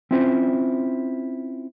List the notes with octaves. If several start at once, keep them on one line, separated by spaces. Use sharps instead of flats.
C4 C#4 E4 F4 C5